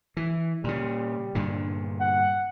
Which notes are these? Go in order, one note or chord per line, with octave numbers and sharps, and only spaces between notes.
E3
A#2 C#3 G3
G2 A#2 D3
F#5